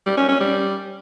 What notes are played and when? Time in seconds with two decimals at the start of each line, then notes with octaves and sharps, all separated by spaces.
0.06 G3
0.17 C#4
0.29 C#4
0.40 G3